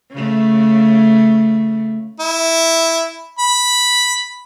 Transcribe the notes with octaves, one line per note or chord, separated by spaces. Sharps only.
C#3 A3
E4
B5